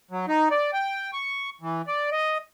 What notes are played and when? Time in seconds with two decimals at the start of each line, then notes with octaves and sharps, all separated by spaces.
0.11 F#3
0.28 D#4
0.51 D5
0.73 G5
1.13 C#6
1.61 E3
1.87 D5
2.12 D#5